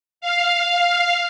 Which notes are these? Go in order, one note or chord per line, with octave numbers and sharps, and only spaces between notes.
F5